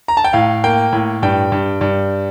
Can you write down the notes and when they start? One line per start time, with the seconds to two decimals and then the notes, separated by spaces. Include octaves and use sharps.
0.08 A#5
0.17 A5
0.24 G5
0.33 A2 F5
0.64 A#3 G5
0.93 A2
1.22 G2 G5
1.52 G2
1.81 G2